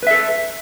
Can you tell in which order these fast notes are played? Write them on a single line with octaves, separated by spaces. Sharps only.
B4 E5 A4